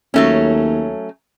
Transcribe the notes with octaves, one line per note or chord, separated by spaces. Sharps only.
D#2 F#3 A3 C#4